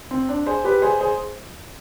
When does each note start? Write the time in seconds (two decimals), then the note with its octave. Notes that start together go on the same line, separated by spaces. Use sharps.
0.11 C4
0.29 D4
0.46 G#4 C5
0.64 G4 B4
0.82 G#4 C5
1.01 G#4 C5